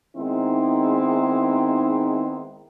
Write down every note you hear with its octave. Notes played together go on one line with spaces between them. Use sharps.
D#3 G#3 B3 C4 D#4 E4